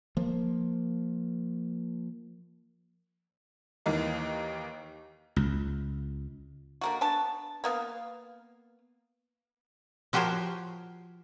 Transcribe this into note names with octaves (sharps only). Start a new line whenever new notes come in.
F3 A#3
D#2 E3 A#3 D#4
C#2
D3 A#3 F#4
B3 D4 A5
A#3 B3 F5
F3 F#4 G4 A#4 C5 C#5